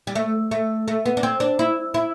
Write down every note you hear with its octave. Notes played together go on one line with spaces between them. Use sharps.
G3
A3
A3
A3
B3
D4
C4
D4
E4
E4